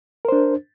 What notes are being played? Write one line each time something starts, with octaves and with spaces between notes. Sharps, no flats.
D4 A#4 C5